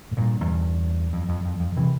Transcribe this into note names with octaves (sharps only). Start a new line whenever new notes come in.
A2
G2 A#2
E2 G2
F2
F2
F2
F2
C3 E3